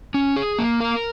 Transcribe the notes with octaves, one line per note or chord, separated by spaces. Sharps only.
C#4
G#4
A#3
A#4